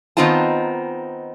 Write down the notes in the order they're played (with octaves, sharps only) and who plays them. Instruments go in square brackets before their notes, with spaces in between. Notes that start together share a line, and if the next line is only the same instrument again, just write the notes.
[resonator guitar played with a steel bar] D#3 B3 C4 D#4 F4 A5